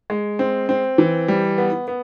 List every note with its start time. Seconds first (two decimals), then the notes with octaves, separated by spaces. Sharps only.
0.10 G#3
0.39 C4
0.69 C4
0.98 E3
1.28 G3
1.58 B3
1.88 B3